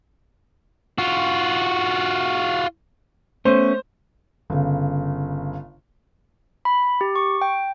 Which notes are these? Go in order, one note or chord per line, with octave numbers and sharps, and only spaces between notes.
F4 F#4
A3 B3 C#4 C5
G1 C#3
B5
G4
C#6
G5